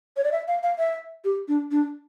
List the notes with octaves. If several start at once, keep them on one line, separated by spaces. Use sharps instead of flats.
C#5
D5
E5
F5
F5
E5
G4
D4
D4